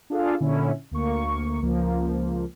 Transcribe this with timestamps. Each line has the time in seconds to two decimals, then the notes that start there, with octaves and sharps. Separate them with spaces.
0.10 D4 F4 G#4 A4 F5
0.40 A#2 D3 C#4 E4
0.91 D2 A#3 C#6
1.62 C#2 F3 A#3